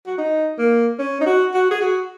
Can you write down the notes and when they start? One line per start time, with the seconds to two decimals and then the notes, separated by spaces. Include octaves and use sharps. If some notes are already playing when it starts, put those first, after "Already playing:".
0.06 F#4
0.18 D#4
0.58 A#3
0.98 C#4
1.21 D#4
1.26 F#4
1.54 F#4
1.71 G#4
1.81 F#4